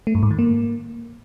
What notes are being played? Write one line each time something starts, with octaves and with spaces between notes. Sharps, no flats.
A3
G2
G#2
D#3
A#3